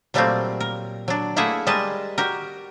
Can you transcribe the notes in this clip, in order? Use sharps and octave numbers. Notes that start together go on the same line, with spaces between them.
A#2 F#3 G3 A3 A#3 C4
A#4
F#3 D4
A3 A#3 E4 G#4 E5 F#5
G3 G#3 A#4 B4 D#5 A5
F#4 G4 A#4